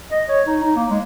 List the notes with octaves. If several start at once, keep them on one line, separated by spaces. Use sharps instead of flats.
D#5
C#5
D#4
D#4
A#3
G#3